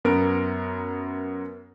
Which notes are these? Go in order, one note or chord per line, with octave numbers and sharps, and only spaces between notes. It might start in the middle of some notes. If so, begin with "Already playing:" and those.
F#2 B3 A#4 D7